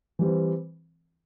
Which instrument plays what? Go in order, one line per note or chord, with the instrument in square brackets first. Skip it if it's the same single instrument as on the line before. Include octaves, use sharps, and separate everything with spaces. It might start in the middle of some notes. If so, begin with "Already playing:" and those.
[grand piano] E3 G3 C4